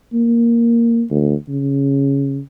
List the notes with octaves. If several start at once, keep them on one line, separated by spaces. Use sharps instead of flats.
A#3
D2
C#3